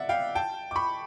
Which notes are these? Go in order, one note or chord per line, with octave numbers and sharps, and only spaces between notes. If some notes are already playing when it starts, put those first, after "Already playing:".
Already playing: D5 E5 F#5
F5 G5
G5 A5
D6
B5 C#6